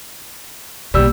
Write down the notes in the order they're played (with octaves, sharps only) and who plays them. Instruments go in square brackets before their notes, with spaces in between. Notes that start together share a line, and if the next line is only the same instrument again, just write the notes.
[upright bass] A#1 B2 [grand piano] G3 E6